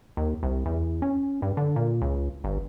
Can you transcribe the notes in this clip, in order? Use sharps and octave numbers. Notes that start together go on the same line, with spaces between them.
D#2
C2
E2
C#4
G2
D3
A#2
C#2
G1